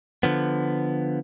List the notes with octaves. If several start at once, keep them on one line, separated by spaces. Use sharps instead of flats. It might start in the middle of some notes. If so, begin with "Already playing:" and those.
D3 F3 B3